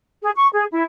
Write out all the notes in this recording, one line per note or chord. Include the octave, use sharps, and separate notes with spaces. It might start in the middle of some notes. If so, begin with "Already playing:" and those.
G#4
C#6
G#4
E4